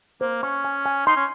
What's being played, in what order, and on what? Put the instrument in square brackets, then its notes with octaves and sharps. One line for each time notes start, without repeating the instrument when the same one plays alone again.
[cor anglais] A#3 [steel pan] C5
[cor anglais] C#4 [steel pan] C#6
[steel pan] G#5
G#5
[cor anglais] D#4 [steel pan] C6
[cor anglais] C#4